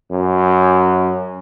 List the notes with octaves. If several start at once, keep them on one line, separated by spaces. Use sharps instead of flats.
F#2